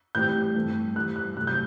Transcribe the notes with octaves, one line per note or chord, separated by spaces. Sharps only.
A2 E3 G3 C4 G6
G2 E3 A3 C4
G2 E3 G3 F#6
F#6
C3 F#3 A3 F#6
G6